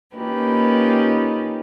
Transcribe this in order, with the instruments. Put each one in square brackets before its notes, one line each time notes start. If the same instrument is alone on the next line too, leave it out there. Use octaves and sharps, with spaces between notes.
[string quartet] A#3 C#4 D#4 F4 G4 B4